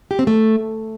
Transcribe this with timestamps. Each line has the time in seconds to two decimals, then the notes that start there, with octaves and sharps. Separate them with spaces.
0.11 G4
0.19 C4
0.27 A3